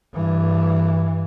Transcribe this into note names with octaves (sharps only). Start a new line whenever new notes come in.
G2 E3